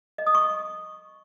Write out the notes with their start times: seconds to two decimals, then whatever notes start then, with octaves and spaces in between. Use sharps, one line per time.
0.18 D#5
0.26 D#6
0.35 C#6